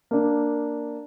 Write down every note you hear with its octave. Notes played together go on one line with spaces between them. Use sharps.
A#3 D4